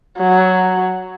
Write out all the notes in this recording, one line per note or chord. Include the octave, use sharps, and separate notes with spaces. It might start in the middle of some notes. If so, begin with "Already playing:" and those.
F#3